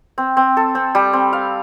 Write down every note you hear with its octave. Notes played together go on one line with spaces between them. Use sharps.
C4
C4
A4
C4
G3
C4
F5